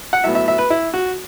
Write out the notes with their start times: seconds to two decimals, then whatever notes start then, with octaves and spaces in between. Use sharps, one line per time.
0.13 F#5
0.24 A2 F#3 B3 E5
0.35 E5
0.48 E5
0.58 B4
0.70 E4
0.94 F#4